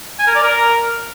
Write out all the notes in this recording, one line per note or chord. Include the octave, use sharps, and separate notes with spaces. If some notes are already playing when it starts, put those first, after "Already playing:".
G#5
A#4
D5
A#4